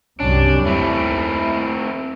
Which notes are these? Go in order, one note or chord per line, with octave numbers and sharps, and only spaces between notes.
C2 F#2 G3 C#4 D4
D#2 A3 C4 E4